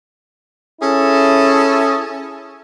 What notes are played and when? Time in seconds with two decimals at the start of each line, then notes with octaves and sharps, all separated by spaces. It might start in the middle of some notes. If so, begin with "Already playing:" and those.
0.81 C#4 E4 G#4 A4